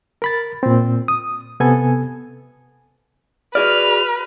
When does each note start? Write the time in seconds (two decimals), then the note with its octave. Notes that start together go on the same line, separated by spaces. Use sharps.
0.22 A#4 B5 A6
0.63 A#2 C4
1.08 D#6
1.60 C3 B3 A4 G#5
3.55 F#4 G#4 B4 D5 F6